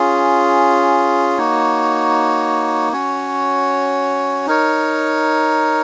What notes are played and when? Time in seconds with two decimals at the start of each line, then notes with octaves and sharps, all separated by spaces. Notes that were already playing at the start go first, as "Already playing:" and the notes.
Already playing: C#4 F4 G#4
1.38 A#3 D#4 F#4 C#5
2.92 C#4 F#4 C#5
4.47 D#4 A#4 C#5